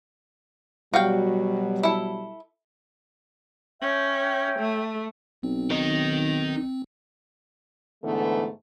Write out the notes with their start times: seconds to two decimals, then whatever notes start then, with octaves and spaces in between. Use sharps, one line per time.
0.94 B2 F#3 G3 F#4 F5 G5
1.83 E4 A4
3.82 C#4 C#5 E5 G5
4.59 A3
5.43 B1 C4
5.70 D#3 D#4
8.04 G#2 D3 E3 G#3 A3 B3